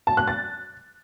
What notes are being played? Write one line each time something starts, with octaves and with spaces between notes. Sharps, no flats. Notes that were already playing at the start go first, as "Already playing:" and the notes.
A5
F#6
A6